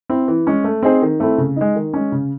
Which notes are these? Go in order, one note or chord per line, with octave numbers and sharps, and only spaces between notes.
C4 E4
E3
G#3 C#4
A3
C4 D#4 G#4 C5
D#3
A3 C4 E4
C#3
G#3 D#4
D#3
G#3 C#4
C#3